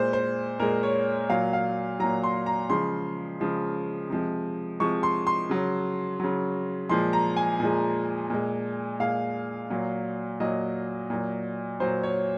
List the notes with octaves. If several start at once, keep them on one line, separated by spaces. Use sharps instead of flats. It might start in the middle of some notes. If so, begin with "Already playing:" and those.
Already playing: A#2 G#3 C5
C5
A#2 G#3 A#4
C#5
A#2 F#3 F5
F5
A#2 F#3 A#5
C6
A#5
C#3 F3 G#3 C6
C#3 F3 G#3
C3 F3 G#3
C3 F3 G#3 C#6
C6
C6
C#3 F#3
C#3 F#3
A#2 F3 G#3 C6
A#5
G#5
A#2 F3 G#3
A#2 G#3
A#2 G#3 F5
A#2 F#3
A#2 F#3 D#5
A#2 F#3
A#2 F#3 C5
C#5